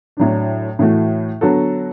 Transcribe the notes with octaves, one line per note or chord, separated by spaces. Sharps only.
A2 F#3 D4
A2 E3 A3 F#4
D3 F#3 B3 F#4 A4